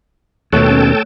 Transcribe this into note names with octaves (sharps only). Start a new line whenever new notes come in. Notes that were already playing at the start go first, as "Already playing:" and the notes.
D#2 B2 A3 A4 C#5 G5 A5 F#6
C#4